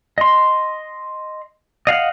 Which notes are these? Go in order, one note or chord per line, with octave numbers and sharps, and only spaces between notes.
D#5 C6
D#5 F5 F#5